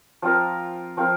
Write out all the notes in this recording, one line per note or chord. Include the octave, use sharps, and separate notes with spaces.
F3 C4 F4 A#4
F3 C4 F4 A#4